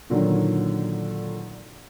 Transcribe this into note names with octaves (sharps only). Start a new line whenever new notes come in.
A#2 D3 D#3 F#3